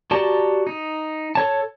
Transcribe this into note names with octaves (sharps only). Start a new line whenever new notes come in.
F#4 G4 D5 A5 A#5
D#4
A4 C#5 A5